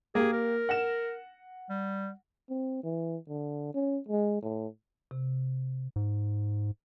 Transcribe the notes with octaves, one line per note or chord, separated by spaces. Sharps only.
A#3 G4 G#4
A#4
F#5 A#6 E7
G3
C4
E3
D3
C#4
G#3
A2
C3
G#2